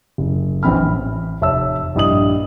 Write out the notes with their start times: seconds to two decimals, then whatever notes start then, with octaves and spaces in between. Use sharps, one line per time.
0.18 F#1
0.63 A#1 E3 C4 B5 F6
0.82 A1
1.41 F1 C#5 E5 A5 E6
1.95 A#1 G2 E4 D#5 D#6 F#7